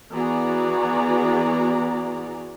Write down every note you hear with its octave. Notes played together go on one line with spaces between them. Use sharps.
E3 B3 F#4 G#4 D5 A#5